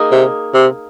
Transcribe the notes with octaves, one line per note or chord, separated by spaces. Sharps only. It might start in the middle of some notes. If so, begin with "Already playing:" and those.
Already playing: A#3 D#4 G#4
C3
C3